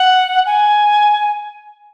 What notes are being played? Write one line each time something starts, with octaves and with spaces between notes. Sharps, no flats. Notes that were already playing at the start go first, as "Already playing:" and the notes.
Already playing: F#5
G#5